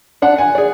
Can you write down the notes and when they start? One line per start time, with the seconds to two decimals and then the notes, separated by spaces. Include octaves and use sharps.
0.22 D4 F#5
0.38 G#5
0.55 G#4 D5